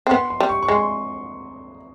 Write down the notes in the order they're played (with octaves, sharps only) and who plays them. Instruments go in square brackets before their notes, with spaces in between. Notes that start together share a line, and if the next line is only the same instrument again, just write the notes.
[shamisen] C4
[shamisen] B3 [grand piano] C6
[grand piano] C6
[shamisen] G3
[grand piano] C#6
C#6
[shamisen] G#3 [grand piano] C6